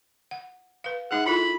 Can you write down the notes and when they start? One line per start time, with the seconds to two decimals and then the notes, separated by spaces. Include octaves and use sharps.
0.31 F#5
0.84 B4 F5
1.11 G#3 D#4 G#4 F#5
1.26 E4 F4 A4 B5